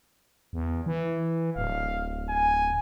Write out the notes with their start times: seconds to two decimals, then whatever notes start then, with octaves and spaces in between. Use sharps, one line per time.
0.53 E2
0.86 E3
1.56 D1 F5
2.28 G#5